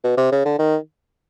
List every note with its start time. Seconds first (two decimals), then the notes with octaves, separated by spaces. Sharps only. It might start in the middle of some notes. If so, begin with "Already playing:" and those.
0.04 B2
0.17 C3
0.32 C#3
0.45 D3
0.59 D#3